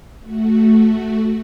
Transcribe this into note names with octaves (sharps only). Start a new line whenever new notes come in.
A3 F#4